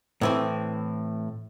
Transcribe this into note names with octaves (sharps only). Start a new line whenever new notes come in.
A2 E3 C4